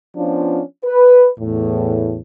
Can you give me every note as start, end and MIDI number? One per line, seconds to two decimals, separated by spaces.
0.17 0.61 53
0.17 0.61 59
0.17 0.61 61
0.17 0.61 62
0.17 0.61 65
0.85 1.29 71
1.40 2.20 40
1.40 2.20 45